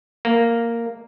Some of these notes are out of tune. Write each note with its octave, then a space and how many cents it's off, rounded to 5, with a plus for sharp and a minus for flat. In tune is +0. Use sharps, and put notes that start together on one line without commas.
A#3 -5